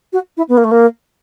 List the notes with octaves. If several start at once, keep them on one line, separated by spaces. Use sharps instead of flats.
F#4
E4
B3
A#3
A3
A#3